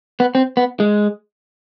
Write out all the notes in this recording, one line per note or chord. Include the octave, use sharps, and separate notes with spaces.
B3
C4
B3
G#3